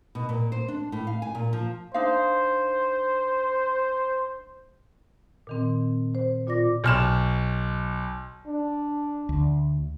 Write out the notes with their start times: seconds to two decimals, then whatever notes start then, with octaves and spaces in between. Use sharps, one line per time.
0.15 B2
0.29 A#2
0.52 C5
0.68 D4
0.92 A2
1.07 F5
1.22 G#5
1.35 A#2
1.53 F3
1.94 D4 D#4 C5 F5
5.47 A#2 D#3 C4
6.15 C5
6.47 A#2 F4 D5 D6 A#6
6.84 B1 F6 E7
8.47 D4
9.29 D2